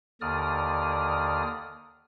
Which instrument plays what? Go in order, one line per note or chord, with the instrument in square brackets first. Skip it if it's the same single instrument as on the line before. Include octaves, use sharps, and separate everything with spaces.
[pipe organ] D#2 D3 D5 D#6 F6